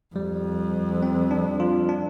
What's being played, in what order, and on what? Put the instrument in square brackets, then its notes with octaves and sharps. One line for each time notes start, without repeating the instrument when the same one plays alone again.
[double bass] F2 [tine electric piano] G3
[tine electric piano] C4
D4
F4
D4